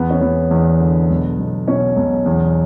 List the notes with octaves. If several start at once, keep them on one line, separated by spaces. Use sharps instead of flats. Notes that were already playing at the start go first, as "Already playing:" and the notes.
Already playing: E2 B3
C#4
E2 B3
E2
D3
B1
B1
B2 C#4
B1
E2